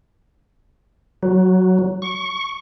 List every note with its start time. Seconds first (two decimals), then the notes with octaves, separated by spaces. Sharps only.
1.23 F#3
2.02 C#6